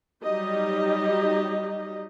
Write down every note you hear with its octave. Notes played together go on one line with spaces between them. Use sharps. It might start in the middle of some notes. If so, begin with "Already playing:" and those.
F#3 G3 D#4 G4 D#5